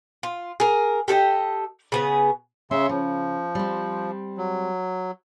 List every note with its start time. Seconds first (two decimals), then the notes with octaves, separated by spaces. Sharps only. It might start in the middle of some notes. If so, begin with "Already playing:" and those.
0.23 F4
0.60 G#4 A#4
1.08 G4 A4 D5 D#5
1.92 C#3 B3 G#4
2.71 C#3 C#4 E5 C6
2.89 C#3 F3
3.55 G3 C4
4.38 F#3